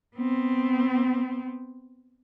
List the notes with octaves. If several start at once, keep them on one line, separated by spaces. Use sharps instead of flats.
B3 C4